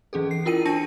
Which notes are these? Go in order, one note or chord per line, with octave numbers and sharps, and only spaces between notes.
E3 C#4 G#4 A4
C7
E4 F4 A#4 G5 D#7
D4 A5 A#6 C#7